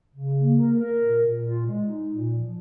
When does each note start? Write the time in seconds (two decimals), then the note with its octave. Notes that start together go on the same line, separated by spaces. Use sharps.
0.15 C#3
0.37 A#3
0.58 A#4
0.79 A#4
1.01 A#2
1.23 A#2
1.44 F4
1.66 G#3
1.87 D#4
2.09 A#2
2.31 F3